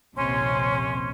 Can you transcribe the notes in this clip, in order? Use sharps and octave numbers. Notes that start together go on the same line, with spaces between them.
A#1 D#2 C3 C#4 C6